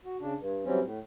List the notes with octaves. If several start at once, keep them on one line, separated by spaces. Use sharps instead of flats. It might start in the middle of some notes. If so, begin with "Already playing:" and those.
F#4
C#3 D4
G2
E3 F#3 G3 C4 C#4
A2